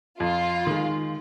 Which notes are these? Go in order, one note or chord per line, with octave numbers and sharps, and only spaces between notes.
F2 F4
D#3 G#3